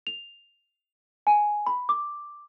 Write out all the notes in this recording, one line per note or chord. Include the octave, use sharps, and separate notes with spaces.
F7
G#5
B5
D6